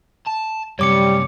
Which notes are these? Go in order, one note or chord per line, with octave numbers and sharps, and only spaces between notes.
A5
F#2 C3 G3 C#5 D6 C#7